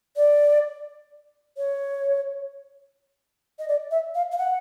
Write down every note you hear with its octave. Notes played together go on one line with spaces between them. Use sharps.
D5
C#5
D#5
D5
E5
F5
F5
F#5